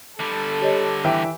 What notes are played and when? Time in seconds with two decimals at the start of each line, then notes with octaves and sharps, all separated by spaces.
0.20 D3 G3 A4
0.61 G4 C#5 D#5
1.05 E3 E5 G5